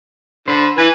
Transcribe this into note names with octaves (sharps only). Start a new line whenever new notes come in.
D3 C5 B5
E3 B4 G#5